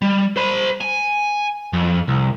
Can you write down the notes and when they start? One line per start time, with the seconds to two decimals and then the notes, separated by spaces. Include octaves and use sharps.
0.02 G3
0.37 C5 B5
0.81 G#5
1.73 F2
2.08 C2